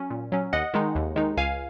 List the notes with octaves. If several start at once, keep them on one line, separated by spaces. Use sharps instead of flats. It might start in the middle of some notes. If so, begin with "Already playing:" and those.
Already playing: F#3 C#4
A#2
F#3 C#4
D#2 D#5 F#5
D#3 G#3 D#4
D#2
D#3 G#3 D#4
C#2 F5 G#5